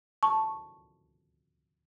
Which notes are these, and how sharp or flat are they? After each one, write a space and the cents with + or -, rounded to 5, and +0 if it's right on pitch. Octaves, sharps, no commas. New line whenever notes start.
A5 +0 C#6 -5